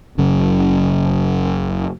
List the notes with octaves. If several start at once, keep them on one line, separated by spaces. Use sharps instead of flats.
F#1 F#2 C#3